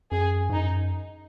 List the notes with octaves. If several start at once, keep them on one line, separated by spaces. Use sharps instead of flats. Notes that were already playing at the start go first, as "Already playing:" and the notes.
F#2 G#4
G#2
F#2 D#4